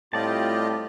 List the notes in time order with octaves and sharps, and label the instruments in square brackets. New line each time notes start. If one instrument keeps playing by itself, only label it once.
[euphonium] A2 [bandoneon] G3 C4 [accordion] F4 G4 D#5 [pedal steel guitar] D5 A5